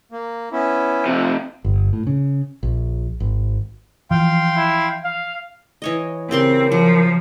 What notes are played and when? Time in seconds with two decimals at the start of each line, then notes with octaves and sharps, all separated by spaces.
0.12 A#3
0.52 B3 C#4 E4
1.06 C3 F3 A3
1.64 G1
1.93 A2
2.07 C#3
2.63 A#1
3.20 G#1
4.11 E3 F3 F5 G5 C6
4.56 E4
5.04 F5
5.82 E3 C#5 D#5
6.31 C#3 C4 G4 A#4 C6
6.72 F3 F#3